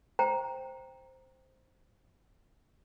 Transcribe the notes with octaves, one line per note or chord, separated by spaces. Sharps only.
C5 G5 A#5